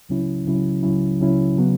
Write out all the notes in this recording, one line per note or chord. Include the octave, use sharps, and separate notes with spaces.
C#2 C#3 F#3 C#4 E4
C#2 C#3 F#3 C#4 E4
C#2 C#3 F#3 C#4 E4
C#2 C#3 F#3 C#4 E4
C#3 F#3 B3